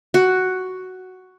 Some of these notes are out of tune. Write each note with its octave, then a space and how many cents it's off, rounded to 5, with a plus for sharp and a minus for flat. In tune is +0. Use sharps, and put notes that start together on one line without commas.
F#4 +5